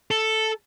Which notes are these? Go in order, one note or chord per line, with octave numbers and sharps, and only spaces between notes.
A4